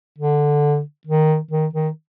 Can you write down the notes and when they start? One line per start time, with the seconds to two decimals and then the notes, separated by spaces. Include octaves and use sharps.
0.18 D3
1.07 D#3
1.51 D#3
1.73 D#3